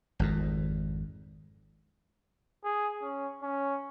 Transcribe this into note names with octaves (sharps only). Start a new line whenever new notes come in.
G#1 F2 G#2
G#4
C#4
C#4